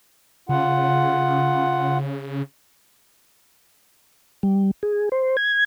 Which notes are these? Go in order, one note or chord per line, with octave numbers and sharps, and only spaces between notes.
C#3 F4 F#5
G3
G#4
C5
G#6